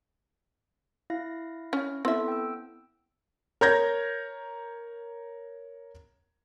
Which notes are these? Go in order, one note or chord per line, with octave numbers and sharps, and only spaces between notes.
E4 F5 A#6
C#4
B3 C4 E4 A4 E5
G5 E6
A#4 C#5 A#5 G6 G#6 A#6